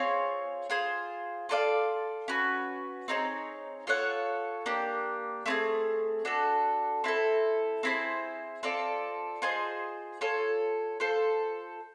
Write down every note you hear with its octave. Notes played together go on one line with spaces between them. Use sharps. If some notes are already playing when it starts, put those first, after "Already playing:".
Already playing: C4 F4 G#4 C#5
F4 G#4 C5
F4 A4 D5 F5
C#4 F#4 B4
C4 D#4 G#4 C#5
F4 A4 C#5 F#5
A#3 D4 G4
A3 C4 E4 G#4
D4 F#4 A4
C4 E4 A4
C4 E4 G#4 C5
C4 F4 A4 D5
F4 G#4 C5 D#5
F4 A4 C#5
F4 A4 C5